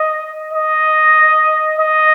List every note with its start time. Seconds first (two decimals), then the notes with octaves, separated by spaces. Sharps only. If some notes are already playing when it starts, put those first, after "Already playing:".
Already playing: D#5
0.53 D#5
1.79 D#5